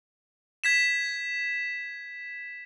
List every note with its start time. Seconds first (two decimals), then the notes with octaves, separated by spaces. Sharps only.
0.64 G#6 B6 E7